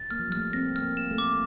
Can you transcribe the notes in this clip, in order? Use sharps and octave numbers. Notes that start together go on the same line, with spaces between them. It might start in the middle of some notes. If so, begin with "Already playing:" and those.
Already playing: A6
A#3 F6
F3
G3
A3 F6
A#3
C4 A#6
F6
A#3
E7
A3
D6